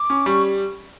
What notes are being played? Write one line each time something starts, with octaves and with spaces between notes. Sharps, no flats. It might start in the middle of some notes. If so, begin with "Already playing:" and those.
Already playing: D6
C#4
G3 C#6